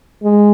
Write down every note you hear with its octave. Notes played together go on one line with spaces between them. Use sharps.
G#3